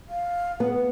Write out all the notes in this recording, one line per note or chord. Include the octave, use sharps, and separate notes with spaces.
F5
B3 F#5